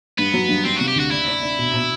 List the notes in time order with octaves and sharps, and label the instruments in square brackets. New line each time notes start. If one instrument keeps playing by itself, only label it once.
[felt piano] G2 [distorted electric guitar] B3
[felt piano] F#3
G2
[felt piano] G3 [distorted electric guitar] C4
[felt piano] C3 [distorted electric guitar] F#4
[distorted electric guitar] G4
[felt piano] D2 [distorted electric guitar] F#4
[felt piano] D4 [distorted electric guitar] E4
[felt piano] D4
D4
B2
B2